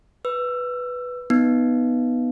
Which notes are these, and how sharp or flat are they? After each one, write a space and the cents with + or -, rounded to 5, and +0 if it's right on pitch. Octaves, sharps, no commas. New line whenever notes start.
B4 +0 E6 +20
B3 +0 D#4 +0